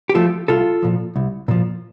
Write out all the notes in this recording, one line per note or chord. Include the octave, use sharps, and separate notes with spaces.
G4
F3 A3 F4 A4
C2 F4 A4
A#2 F3
C2
A#2 F3